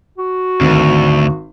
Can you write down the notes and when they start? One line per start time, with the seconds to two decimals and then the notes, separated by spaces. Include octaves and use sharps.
0.18 F#4
0.61 G#1 D2